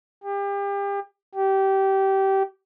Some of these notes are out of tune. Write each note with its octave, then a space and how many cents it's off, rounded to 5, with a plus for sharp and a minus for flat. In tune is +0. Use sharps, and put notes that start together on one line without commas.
G4 +35
G4 -20